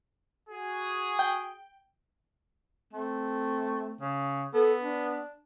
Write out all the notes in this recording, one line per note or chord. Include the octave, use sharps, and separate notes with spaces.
F#4 G#4
G5
A3 C4
C#3
B3 A4
D4